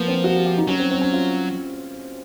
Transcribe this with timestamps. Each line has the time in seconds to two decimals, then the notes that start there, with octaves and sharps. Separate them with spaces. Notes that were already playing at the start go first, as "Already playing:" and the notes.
Already playing: F3 A#3 B3
0.08 C4
0.24 F#4
0.35 G4
0.46 G4
0.57 D#4
0.68 F#3 C#4
0.79 C4
0.91 C4
1.01 C#4
1.13 F4